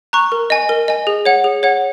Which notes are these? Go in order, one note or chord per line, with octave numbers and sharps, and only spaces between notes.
A#5 C#6 F#6
A#4
D#5 G#5
A#4
D#5 G#5
G#4
C#5 F#5
G#4
C#5 F#5